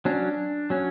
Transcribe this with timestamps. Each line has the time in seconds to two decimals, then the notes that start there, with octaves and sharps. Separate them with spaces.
0.05 F#3 C#4 D4
0.70 F#3 C#4